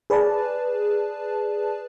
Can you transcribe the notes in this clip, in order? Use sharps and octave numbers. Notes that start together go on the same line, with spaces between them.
G#4 B4 D5 A5